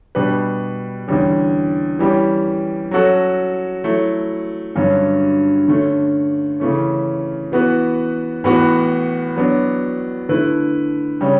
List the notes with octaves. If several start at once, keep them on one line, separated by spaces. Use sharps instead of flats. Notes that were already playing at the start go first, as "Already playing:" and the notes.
B2 G3 D4 G4 B4
E2 D3 G3 C#4
E3 G3 C#4 G4
F#3 C#4 F#4 A4
F#3 A3 E4
G2 D3 F#3 C#4
D3 A3 C#4
C#3 E3 A3 C#4
E3 B3 F#4 B4
A2 E3 B3 F#4 B4
F#3 B3 D4
D3 A3 E4 B4
C#3 G3 C#4